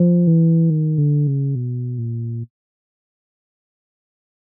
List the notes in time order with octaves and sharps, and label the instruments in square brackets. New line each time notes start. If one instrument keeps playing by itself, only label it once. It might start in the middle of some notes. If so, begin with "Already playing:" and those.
Already playing: [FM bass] F3
E3
D#3
D3
C#3
B2
A#2